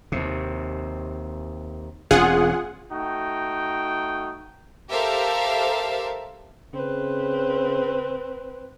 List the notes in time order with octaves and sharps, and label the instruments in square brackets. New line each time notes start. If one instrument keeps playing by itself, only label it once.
[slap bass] D#2 C3
[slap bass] E1 C4 C#4 [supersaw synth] F4 G#4 F#5
[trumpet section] A3 D#4 F#4 G5
[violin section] G4 A4 A#4 C5 E5 F5
[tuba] C#3 [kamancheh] C4 B4